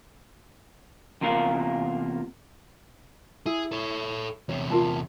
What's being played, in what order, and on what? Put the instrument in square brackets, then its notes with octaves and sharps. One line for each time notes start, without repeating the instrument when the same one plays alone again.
[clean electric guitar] E2 C3 A#3 F4 A#4
[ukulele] E4 [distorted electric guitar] G#4
[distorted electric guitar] A4 C#5
[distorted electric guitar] E2 C3 [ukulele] C#5
[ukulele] F4 A#4 A5